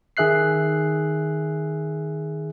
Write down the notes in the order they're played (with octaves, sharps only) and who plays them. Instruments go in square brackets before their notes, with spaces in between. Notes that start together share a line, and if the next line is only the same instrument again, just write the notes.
[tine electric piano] D#3 G#4 E5 F#6 C7